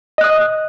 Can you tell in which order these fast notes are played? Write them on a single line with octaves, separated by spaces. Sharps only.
D#5 F#6 D#6